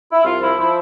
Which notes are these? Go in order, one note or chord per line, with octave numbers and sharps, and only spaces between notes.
E4
C2 F4
F3 E4
F3 E4